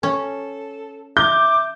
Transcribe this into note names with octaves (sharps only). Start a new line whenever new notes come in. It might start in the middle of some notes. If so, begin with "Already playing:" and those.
C#4 A4
E5 D6 G6